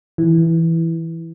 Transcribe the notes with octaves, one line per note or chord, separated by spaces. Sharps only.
E3